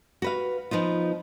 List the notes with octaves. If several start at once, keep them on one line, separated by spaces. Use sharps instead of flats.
F#4 B4 F5
F3 B3 D#4 F4